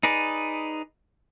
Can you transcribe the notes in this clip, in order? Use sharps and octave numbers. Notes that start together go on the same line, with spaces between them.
D#4 G#4 B4 D5